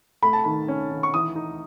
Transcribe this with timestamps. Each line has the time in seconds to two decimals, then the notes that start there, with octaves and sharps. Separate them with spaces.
0.23 A3 B5
0.33 A5
0.44 D#3 B5
0.68 C#4
0.91 D#3
1.03 C#6
1.14 E3 D#6
1.36 D#4